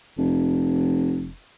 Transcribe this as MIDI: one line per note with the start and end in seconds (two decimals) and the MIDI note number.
0.18 1.32 29